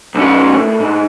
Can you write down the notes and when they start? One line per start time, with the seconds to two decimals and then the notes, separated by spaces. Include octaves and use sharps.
0.15 B1 C#4
0.56 A2
0.80 G#2